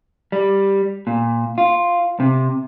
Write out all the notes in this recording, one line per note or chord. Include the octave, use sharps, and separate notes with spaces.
G3
A#2
F4
C3